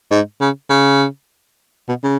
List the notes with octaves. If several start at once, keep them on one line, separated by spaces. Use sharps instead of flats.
G#2
C#3
C#3
B2
C#3